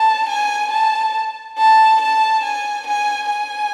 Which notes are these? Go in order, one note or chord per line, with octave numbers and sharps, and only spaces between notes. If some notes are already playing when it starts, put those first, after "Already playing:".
Already playing: A5
G#5
A5
A5
A5
G#5
G#5
G#5